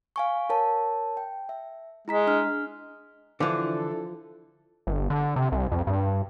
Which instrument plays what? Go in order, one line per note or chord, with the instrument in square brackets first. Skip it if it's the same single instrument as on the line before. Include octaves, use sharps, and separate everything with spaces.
[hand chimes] F5 G#5 C#6
A#4 C#5 A5
G5
E5
[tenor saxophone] G#3 [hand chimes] E4 A#5 B6
[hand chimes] D4 F6
[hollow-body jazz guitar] D3 E3 [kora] F3 [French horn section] D4 E4 A4
[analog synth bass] G1
D3
C3
C2
F2
G2